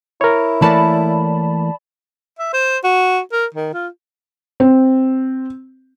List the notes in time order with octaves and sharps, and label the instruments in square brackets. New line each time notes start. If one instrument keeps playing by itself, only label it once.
[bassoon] E4 [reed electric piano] A#4 C#5
[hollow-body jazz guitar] E3 A3 A#3 [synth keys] D5 A5 B5
[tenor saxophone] E5
C5
F#4
A#4
D#3
F4
[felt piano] C4